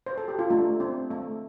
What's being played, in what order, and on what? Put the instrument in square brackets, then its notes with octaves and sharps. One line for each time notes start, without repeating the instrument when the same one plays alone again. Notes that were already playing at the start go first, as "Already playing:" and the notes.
[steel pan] C5
A4
G4
F4
A3 D4
C4
A3